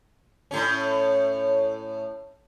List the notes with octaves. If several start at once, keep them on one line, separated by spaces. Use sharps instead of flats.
A2 C#4